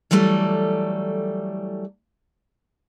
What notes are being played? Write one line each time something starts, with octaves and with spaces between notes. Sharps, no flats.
E3 F#3 G3 A3 A4